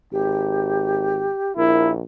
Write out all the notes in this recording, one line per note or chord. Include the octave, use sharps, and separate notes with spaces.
G#1 G4
A#1 E4 A#4